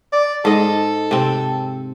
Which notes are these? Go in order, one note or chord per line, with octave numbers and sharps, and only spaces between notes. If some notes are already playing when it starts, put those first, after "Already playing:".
D5
G#2 A4 D#5
C3 C4